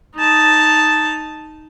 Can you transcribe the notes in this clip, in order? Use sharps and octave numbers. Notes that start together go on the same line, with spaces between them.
D#4 A5